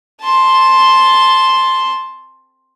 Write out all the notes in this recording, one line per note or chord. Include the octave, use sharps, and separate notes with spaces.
A5 C6